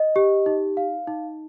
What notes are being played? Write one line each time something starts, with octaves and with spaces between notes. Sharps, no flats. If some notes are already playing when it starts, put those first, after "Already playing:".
Already playing: D#5
G4
D#4
F5
D#4